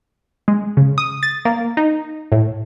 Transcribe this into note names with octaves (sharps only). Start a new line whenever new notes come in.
G#3
C#3
D#6
A6
A#3
D#4
A2